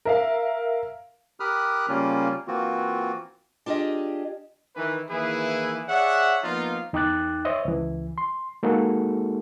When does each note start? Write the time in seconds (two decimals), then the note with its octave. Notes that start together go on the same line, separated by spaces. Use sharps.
0.05 A#4 E5 F5
1.40 G4 A#4 B5 D#6 F6 F#6
1.89 C#3 G3 A#3 C#4 F4 A#4
2.47 E3 A#3 C4 F4 F#4
3.66 D4 F4 G4 G#4 D#5
4.76 D#3 E3 B4
5.09 D#3 E3 A#3 E4 G#4 B4
5.88 G#4 C#5 D5 E5 F#5
6.43 F3 A#3 B3 D#4 F4
6.93 E2 D#4 G5 D6 F#6 A6
7.45 C5 C#5 D#5 E5
7.65 C#2 E3
8.18 C6
8.63 G#3 A#3 D#4 F#4 G#4 A4